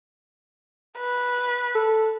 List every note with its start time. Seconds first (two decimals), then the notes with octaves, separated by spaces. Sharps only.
0.97 B4
1.75 A4